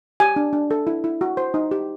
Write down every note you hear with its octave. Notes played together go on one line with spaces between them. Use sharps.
G4 G#5
D4
D4
A4
E4
E4
F#4
C5
D#4
G4